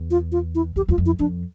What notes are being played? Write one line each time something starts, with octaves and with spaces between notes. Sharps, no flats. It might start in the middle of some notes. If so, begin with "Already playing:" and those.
Already playing: E2
F4
F4
E4
E2 G4
E2 F4
F2
E4
F2 D4